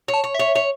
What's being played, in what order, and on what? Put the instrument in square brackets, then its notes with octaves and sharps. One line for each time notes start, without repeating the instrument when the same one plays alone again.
[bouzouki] C#5
[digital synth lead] A5
[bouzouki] C#5
[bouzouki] C#5 [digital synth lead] E5
[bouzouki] C#5